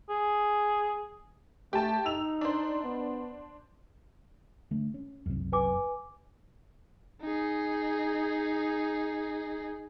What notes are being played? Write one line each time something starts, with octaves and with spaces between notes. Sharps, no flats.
G#4
A3 G4 A5
D#4 E6 F7
D4 C5
B3
D3 A3
C#4
F#1 C2 F#2
B4 G#5 D6
D#4 G#4